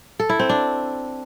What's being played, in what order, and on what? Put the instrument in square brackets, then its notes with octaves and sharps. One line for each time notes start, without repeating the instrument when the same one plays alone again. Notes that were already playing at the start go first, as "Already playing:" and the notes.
[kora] A4
E4
C4
D4